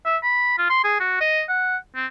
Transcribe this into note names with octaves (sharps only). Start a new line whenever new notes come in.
E5
B5
F4
C6
G#4
F#4
D#5
F#5
C4